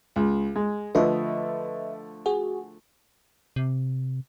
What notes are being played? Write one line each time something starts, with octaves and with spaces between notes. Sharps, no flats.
C#2
G#3
D3 F3 A3 B4 D#5 E5
F#4 G#4
C3